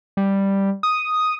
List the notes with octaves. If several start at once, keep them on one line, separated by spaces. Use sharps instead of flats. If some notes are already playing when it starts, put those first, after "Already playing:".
G3
D#6